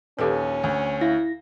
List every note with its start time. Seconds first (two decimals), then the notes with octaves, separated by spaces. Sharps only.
0.19 A#1 D#2 C#4 G4 A4 B4
0.64 D2
1.01 E4 F5 A#6